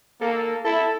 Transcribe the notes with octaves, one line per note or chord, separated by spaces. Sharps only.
A#3 A4
E4 A4